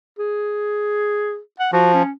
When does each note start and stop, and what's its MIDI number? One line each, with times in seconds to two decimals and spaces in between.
0.19 1.39 68
1.59 1.70 78
1.72 2.03 53
1.72 1.92 66
1.93 2.11 61